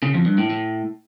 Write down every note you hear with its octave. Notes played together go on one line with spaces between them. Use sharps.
C#3
F2
G2
A2
A2